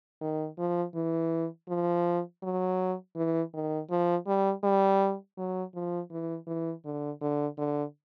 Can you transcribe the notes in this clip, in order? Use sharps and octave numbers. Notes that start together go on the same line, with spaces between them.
D#3
F3
E3
F3
F#3
E3
D#3
F3
G3
G3
F#3
F3
E3
E3
D3
D3
D3